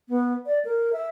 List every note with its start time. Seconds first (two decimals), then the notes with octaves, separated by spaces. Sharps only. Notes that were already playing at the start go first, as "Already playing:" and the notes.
0.09 B3
0.46 D5
0.65 A#4
0.93 E5